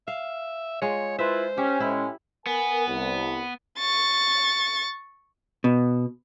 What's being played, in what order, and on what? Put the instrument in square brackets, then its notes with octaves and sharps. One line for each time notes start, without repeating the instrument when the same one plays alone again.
[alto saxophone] E5 [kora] F5
[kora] G#3 F4 [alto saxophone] C#5
[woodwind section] E4 F4 B4 [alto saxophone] C5 [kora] E5
[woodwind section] C#4 [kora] G4
[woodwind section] A2 G#3 C#4 [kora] E4
[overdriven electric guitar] B3 [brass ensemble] A#4 G#5
[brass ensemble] C2
[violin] C#6 A6
[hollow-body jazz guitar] B2